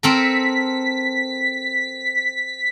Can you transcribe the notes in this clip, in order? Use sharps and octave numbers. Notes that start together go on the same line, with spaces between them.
C4 A4 A#4 B6